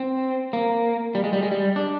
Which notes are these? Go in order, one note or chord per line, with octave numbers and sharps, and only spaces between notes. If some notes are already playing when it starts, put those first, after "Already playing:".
Already playing: C4
A#3
G3
G#3
G3
G#3
G3
D4